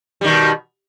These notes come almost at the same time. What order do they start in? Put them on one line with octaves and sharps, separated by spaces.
G3 D#3 B2